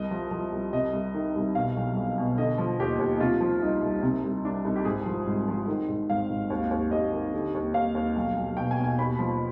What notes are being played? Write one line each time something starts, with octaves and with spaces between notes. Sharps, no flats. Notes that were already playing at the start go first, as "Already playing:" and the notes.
Already playing: C2 D#5
F3
F3
C2
C3 D#5
C2
D#3
C2
B2 F5
B1
B1
B2
D3 D#5
F3
D#2 G4
D#2
D#4
C3 F4
F3
C2 D#4
C2
C3
C2
C2 D4
C2 D#4
G4
G#1 G#4
F3
G#2
F3
D#3
G#2
G#1 F5
G#1
D#2
D#2
D#2 D#5
D#3
D3
D#2
D#2 F5
D#2
B1
B1
B2 G5
G#5
B2
G#5
D#2 B5
F3